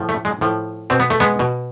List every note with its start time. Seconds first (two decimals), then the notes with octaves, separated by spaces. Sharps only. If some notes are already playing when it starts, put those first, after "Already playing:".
Already playing: A2 F3
0.09 A3
0.25 G#3
0.41 A2 F3
0.90 B2 C4
1.00 B3
1.10 A3
1.20 G#3 B3
1.39 B2